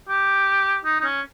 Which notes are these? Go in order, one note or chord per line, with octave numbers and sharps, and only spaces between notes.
G4
D#4
D#4
C#4